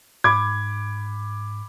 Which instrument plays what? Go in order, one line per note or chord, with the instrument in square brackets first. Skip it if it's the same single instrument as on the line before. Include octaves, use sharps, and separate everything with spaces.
[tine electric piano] G#2 [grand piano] B5 D6 G#6